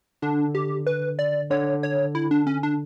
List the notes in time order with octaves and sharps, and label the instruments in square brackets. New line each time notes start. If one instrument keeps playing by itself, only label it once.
[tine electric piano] D3 [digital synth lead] D4
[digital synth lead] G4
B4
D5
[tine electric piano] D3 [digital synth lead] C#5
[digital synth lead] C#5
E4
D4
C#4
D4